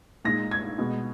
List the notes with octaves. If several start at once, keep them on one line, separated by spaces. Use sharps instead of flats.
A#2 G#3 D#4 A#6
G#6
B2 G#3 B3